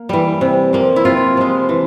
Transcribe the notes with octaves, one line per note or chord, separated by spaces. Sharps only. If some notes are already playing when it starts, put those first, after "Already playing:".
Already playing: A#3
E3 G3
C3
F3 A#3
E4
C3 F4
F3 G#3
E3